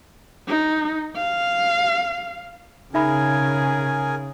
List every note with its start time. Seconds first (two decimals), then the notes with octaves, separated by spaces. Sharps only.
0.48 D#4
1.16 F5
2.94 C#3 D#4 G#4 A#4 E5 G#5 B5